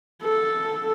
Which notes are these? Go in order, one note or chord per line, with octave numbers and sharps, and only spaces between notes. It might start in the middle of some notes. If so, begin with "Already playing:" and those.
A4